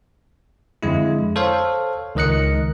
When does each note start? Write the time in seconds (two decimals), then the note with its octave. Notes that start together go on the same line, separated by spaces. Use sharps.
0.83 F2 D3 G#3 E4
1.36 A4 C5 C#5 F5
2.15 C#2 D#3 A#4 D#5 F#6 C#7